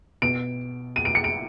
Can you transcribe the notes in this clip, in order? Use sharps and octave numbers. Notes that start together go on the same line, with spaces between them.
B2 D7
D#7
D7
C#7
D7